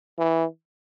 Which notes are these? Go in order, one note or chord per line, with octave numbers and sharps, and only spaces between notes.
E3